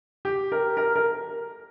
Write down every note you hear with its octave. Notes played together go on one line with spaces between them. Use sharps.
G4
A#4
A#4
A#4